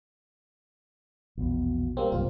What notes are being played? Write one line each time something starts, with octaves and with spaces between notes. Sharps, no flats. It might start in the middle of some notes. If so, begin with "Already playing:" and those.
A#1 E2 B2
G3 A#3 C4
F#1 B1 C3 F4